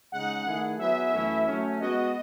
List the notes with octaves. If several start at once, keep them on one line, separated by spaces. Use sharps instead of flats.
C#3 G#3 D#4 F#5
D#3 A3 E4 G#4
F#3 B3 E4 G#4 B4 E5
F#2 E3 A3 C#4 E4
F#3 A3 C#4
G#3 B3 F#4 D#5